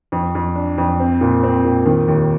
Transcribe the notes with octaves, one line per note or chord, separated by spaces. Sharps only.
F2
F2
D4
F2
C4
A#2
C4
A#2
D#3
D#2